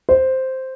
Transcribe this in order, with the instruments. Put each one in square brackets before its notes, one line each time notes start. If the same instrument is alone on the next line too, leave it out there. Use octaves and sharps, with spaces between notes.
[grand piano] C5